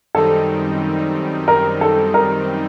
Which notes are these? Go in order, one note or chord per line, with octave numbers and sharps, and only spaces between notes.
F#2 D#3 G3 C4 D#4 A4
A#4
A4
A#4